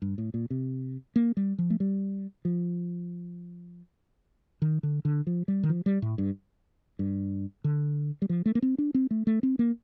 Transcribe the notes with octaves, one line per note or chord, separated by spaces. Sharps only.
G2
A2
A#2
C3
A#3
G3
F3
A3
G3
F3
D#3
D3
D3
F3
G3
D#3
F3
G3
A2
G2
G2
D3
G3
F3
A3
A#3
C4
D4
C4
A3
A3
C4
A#3